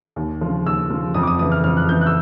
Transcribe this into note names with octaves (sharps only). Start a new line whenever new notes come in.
D#2
C#3 F3
D#2 E6
C#3 F3
F2 D#6
D6
D#6
C#3 E3 D#6
F6
F2 F6
F#6
C#3 E3 G6
F#6
E6